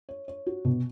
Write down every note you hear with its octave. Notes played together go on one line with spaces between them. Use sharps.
C#5
C#5
F#4
B2